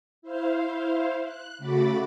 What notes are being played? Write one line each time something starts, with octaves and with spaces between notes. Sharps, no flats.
E4 C5 F5
F#6
C#3 A3 F#4 B5 D6 A6